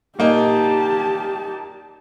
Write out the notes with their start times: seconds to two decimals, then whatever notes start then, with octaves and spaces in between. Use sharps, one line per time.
0.19 A#2 A#3 D#4 G4 A5